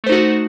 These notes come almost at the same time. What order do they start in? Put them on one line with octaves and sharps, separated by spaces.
A3 C5 D#4 F#4